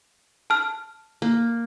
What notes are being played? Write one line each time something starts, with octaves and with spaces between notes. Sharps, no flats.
A5 F6
A#3